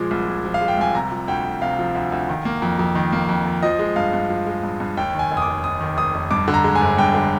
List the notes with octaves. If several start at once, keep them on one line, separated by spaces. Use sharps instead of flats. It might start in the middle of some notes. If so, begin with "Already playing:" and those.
Already playing: A#2 F3 G#3 D6
C2
A#2
F3
F5
G#3
G5
C2 G#5
C3 A#5
F3
D2 G5
D2
C3 F5
F3
D2
D2
D#3
A#3
F2
F2
D#3
A#3
F2
F2
F3 D#5
G#3
G2 F5
G2
F3
G#3
G2
G2
D#2 G5
D#3 G#5
F1
D#6
D6
F1
D#2 D#6
D#3
F1 D#6
F1
G2 D6
D3
A#5
G#3
G#5
G1
G2 G5
D3